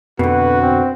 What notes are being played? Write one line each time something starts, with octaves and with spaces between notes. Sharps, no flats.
F2 B2 D3 F#4 B4
C4